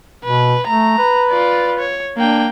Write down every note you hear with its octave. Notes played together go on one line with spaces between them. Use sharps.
B2 B4
A3 A#5
B4
F4 D5
C#5
A#3 D4 G5